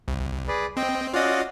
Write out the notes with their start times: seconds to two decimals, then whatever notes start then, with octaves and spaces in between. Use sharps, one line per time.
0.08 C2
0.48 G#4 B4 D5
0.77 C4 D#5 G5
1.14 C#4 F4 F#4 D5 D#5